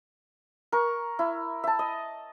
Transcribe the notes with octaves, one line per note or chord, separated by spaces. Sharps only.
A#4 C#6
E4
E5 A5
D#5